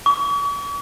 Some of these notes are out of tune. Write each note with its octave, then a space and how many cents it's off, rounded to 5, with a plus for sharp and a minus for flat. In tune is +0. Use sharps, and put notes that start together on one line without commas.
C#6 +45